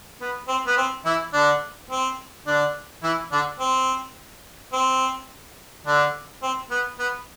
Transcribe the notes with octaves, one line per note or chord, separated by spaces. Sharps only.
B3
C4
B3
C4
E3 E4
D3 D4
C4
D3 D4
E3 E4
D3 D4
C4
C4
D3 D4
C4
B3
B3